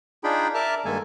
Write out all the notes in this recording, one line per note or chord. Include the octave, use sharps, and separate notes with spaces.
D4 D#4 F4 G#4 G5 B5
A#4 D5 E5 A5 D6 F6
G2 D#3 G#3 A#3 A4 G#5